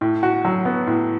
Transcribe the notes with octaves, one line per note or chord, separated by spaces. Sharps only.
A2
F#4
F#3
B3
A2